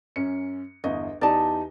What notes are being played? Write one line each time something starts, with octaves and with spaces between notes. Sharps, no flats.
F#2 C#4 C#7
G1 E2 D#5
E2 D#4 G4 D5 A5